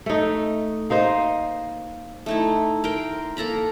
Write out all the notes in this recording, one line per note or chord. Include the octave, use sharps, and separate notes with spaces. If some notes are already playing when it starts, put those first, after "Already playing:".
A3 D#4
A#3 D#4 C5 D#5
A3 D#4 E4
A#4 G5 C6
A#3 A4 A#5 B5